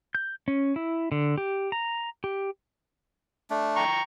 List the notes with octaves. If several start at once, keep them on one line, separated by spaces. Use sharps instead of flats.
G6
C#4
E4
D3
G4
A#5
G4
A3 D4
G5 A#5 C#6